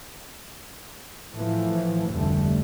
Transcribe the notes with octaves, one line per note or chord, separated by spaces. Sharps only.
A2 E3 F3 A3
F1 D2 D3 G3 A3